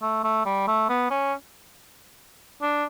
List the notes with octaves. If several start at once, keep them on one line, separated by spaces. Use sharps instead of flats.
A3
A3
G3
A3
B3
C#4
D4